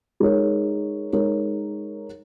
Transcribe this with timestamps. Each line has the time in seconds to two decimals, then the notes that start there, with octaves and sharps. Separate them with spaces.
0.20 G#3 D#4 A#4 C#5
1.13 G#3 D#4 A#4 C#5